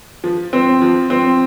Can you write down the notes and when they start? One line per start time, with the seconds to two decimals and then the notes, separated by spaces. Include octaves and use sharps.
0.24 F3
0.53 C4
0.82 F3
1.10 C4